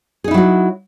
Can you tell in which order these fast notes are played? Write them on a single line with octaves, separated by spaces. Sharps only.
G#4 D#4 E4 F#3 F#4